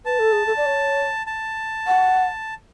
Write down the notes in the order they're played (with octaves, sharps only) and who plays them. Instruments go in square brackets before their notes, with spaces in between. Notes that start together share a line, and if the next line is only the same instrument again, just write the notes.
[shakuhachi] B4 [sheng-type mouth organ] A5
[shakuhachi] A4
G#4
A4
D5
C#5
[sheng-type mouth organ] A5
[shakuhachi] F#5